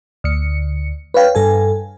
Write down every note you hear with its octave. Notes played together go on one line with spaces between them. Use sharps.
D2 C#7
B4 C#5 F5 G5
G2 A4 G#5